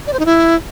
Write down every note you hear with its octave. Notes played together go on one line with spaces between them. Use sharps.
D5
C5
D#4
E4